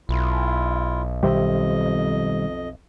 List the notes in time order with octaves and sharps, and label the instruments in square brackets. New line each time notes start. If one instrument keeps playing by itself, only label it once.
[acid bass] B1 [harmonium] E4 F4
[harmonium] F2 D#5 [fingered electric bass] B2 D#3 G3 [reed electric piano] G4 C5 E5